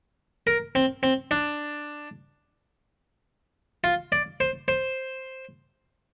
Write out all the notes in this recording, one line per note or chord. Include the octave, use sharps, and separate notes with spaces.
A#4
C4
C4
D4
F4
D5
C5
C5